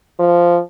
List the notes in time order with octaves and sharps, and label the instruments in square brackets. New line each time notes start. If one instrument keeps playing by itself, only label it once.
[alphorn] F3